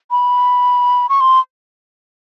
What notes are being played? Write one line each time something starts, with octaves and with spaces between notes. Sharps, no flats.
B5
C#6
C6